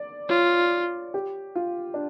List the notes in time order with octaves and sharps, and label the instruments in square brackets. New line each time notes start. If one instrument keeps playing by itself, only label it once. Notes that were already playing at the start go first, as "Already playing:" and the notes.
Already playing: [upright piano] D5
[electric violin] F4 [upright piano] C#5
[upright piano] G4
F4
D4